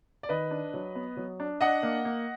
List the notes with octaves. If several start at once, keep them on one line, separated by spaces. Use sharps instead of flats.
D5
D#3 B4 D#5
D4
F#3
B3
F#3
D4
D4 D#5 F#5
A#3
A#3